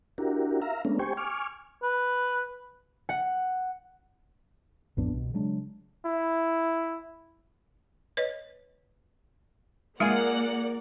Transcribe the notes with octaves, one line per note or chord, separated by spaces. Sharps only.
D4 E4 F#4 G4 A#4
E5 F5 A#5
G#3 A3 B3 C#4 D4
G4 C5 G5 G#5 C#6
G#5 C#6 D6 F6
B4
F#5
A1 F2 B3 D4
C2 B2
C#3 F#3 G#3 D4
E4
B4 C#5 D#5
G#3 A#3 F4 G#4 A#4 D5 F#5